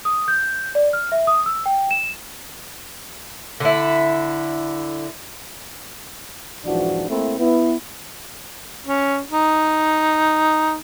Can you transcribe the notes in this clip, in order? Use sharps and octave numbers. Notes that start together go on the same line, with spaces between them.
D#6
G6
D5
F6
E5
D#6
E6
G5
E7
D3 E4
B1 G#2 E3 F3 D4 F#4
A3 A#3 C4 E4
B3 E4
C#4
D#4